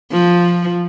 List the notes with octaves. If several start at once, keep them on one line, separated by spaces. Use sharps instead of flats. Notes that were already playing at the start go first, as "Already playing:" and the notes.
F3